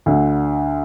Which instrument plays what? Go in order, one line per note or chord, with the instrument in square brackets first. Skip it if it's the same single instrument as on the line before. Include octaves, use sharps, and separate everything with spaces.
[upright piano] D2 D3